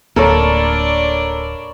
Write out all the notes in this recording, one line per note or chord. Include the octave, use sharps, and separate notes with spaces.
D1 A#3 D4 A4 A#4 C#5 D5 B5